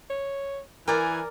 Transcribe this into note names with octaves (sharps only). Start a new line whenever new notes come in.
C#5
E3 A#4 D5 G#5